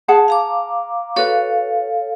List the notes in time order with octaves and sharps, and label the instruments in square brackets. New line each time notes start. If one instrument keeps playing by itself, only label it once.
[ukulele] G#4 F#5 A5
[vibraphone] F5 A#5 D6
[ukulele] F#4 B4 [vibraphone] A4 C#5 F5